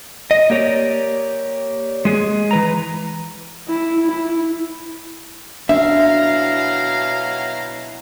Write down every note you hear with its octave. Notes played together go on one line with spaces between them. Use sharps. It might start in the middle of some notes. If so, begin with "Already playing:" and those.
D#5
A#3 G4 C#5 D5
G#3 G#4
E3 B4 A#5
E4
E4
B2 F#3 D4 E4 E5 F5 A#5